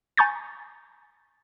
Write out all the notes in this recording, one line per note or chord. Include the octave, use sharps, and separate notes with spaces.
G#5 A#5 C#6 G6 A6